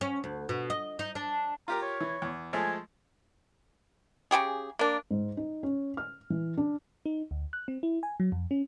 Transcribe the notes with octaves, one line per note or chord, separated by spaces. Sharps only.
C#4
D2
B2
D#5
D#4
D4
F4 G4 A#4 A#5
C#5
E3
E2
F3 G#3 A3 G#5
C#3 G3 G4 G#4
A#3 D4
G#2
D#4
C#4
F6
E3
D4
D#4
D2
F#6
C4
E4
G#5
F#3
F2
C#4